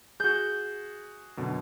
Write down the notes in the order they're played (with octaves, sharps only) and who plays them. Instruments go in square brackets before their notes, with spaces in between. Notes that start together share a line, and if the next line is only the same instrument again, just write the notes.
[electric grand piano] F#4 G#4 [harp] G6
[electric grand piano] F#2 B2 D3